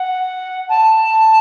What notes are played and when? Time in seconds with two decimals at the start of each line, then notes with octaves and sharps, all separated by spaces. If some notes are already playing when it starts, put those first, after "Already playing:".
Already playing: F#5
0.69 A5